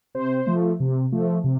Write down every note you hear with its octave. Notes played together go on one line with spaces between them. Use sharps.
C3 C5
F3 A3
C3
F3 A3
C3